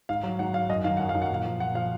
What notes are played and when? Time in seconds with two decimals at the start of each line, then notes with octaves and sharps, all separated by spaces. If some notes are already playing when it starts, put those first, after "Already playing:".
0.09 G#2 F5
0.23 F#3
0.39 G#2 F#5
0.54 F#3 F5
0.69 F#2 D#5
0.84 D#3 F#3 F5
0.97 F#2 F#5
1.09 F5
1.15 D#3 F#3
1.22 F#5
1.30 A#2 F5
1.45 F3
1.60 A#2 F#5
1.75 F3 F5